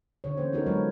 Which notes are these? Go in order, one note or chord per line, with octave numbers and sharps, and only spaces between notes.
D3 C#5
E3 A#3 C#4 C5
B3 D4 D#4 F#4 A4 A#4
F#3 G#3 F4 B4 C#5